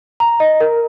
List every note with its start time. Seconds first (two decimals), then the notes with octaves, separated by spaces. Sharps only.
0.20 A#5
0.40 D#5
0.60 A#4